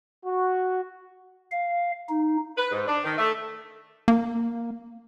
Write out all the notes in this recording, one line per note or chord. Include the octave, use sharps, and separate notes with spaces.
F#4
F5
D#4
B4
G#2
D4
D#3
A3
A#3